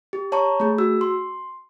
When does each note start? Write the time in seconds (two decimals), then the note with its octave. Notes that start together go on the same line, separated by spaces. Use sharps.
0.13 G4
0.32 C#5 A5 A#5 C#6
0.60 A3 G#4
0.78 F#4 E6
1.01 C6